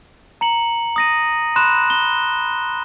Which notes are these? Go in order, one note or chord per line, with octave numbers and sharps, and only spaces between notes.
A#5 C#7 F#7
D#6 A#6 D#7
B5 C6 F#6 E7
G7